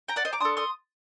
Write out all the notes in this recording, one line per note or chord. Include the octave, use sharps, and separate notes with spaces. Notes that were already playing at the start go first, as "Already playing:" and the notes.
G5 A#5
D5 F#5
C5 D#5
A#5 D6
D4 A4 C6 D#6
C6 D#6